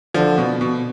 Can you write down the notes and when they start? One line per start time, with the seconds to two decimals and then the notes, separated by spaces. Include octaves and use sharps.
0.14 D3 F3
0.38 B2
0.61 B2